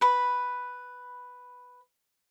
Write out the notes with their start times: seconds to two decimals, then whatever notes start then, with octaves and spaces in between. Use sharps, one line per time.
0.01 B4 B5